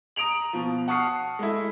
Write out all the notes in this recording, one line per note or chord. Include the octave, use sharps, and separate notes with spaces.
A#5 D#6 D7 F7 F#7
B2 F3
F#5 A5 C#6 D#6 F6 C7
G#3 A3 E4